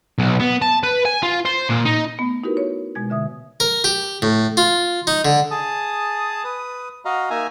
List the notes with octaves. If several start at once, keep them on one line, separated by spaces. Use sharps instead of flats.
B1
B3
A5
B4
G#5
F4
C5
A#2
D#4
A3 B3
D#4 E4 F#4 G4 A#4 B4
C#5
B2 G#3 G#6
D3 E5 D#6
A#4
G4
A2
F4
D#4
D3
G#4 A5 D#6
B4 D#6
F#4 D#5 F5 A#5
A#3 D#4 E5 G#5 A#5